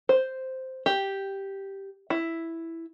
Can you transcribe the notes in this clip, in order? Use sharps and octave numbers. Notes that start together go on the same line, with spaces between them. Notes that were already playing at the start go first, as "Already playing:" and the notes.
C5
G4
E4